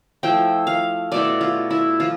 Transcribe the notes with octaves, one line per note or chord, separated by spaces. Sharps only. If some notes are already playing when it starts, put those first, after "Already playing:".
F3 A3 E4 G5
F5
B2 A3 E4 D5
F4
E4
F3 F4